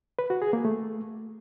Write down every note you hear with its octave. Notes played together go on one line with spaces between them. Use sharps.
B4
F#4
G#4
A#3
A3